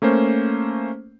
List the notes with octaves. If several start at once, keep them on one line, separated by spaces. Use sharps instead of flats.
A3 A#3 C#4 C5